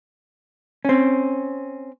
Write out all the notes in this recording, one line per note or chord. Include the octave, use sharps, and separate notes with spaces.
C4 C#4